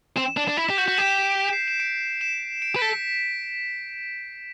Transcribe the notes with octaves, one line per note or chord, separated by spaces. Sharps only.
C4 E7
D4 E7
D4
E4 B6
G4
F#4 G6
F#4
G4 E7
E7
D7
C7
E7
D7
E7
D7
B4
A4 B6